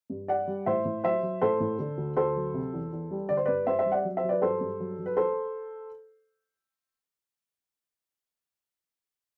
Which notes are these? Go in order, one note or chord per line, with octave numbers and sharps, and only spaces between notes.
G2
G3 D5 F#5
G3
A2 C5 E5
A2
F#3 C5 E5
F#3
A2 A4 C5
A2
D3
D2
D2 A4 C5
F#3
C3
E2
E2
G3
D3 D5
C5
G2 B4 D5
G2 C5 E5
C5 E5
G3
D5 F#5
F#3
C5 E5
F#3
B4 D5
G2 A4 C5
G2
F#3
F#3
B4
A4 C5